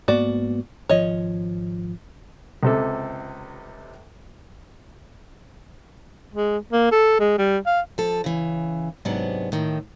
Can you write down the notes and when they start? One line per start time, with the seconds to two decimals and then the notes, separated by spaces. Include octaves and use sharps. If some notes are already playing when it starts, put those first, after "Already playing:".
0.08 G#2 A#3 B3 F#4 D5
0.89 G#1 F3 C#5 D#5
2.63 C#2 C3 A4
6.34 G#3
6.72 A#3
6.92 A4
7.20 G#3
7.38 G3
7.66 F5
7.98 F3 A4
8.24 C#3 E3
9.05 G#2 C3 F#3 B3 D4
9.52 A2 D#3